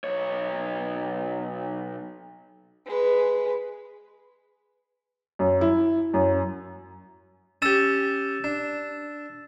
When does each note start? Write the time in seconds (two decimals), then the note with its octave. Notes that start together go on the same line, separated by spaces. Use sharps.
0.04 B1 C#5
2.86 G#3 B4
5.39 F#2
5.61 E4
6.14 F#2
7.62 C#4 G4 E6 A6 E7
8.44 D4